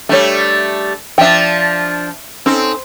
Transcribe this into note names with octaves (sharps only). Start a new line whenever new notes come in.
G3 A3 D4 C#5
F3 D4 E5 G5
C4 C#4 D#4 A4